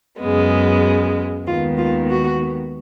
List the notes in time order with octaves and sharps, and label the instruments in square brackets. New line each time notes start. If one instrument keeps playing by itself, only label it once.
[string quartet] F#2 C#3 G#3 B3
D#2 D#3 G#3 B3 F4
F4
F#4